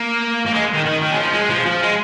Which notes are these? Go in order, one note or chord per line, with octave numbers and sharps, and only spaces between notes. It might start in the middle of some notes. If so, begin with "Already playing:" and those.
Already playing: A#3
A#3
G#3
D#3
D#3
D#3
G#3
F3
G#3
F3
F3
G#3